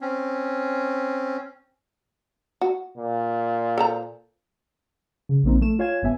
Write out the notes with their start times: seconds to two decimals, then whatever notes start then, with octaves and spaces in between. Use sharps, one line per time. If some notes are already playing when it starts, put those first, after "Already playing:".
0.01 C4 C#4
2.61 F#4
2.97 A#2
3.78 A4 C5 A#5
5.29 C#3
5.44 A#1 A#3 C4 D#4
5.61 A3 E7
5.79 F4 C#5 F5 G#5 G#6 E7
6.02 G1 G#2 B3 E5 G#5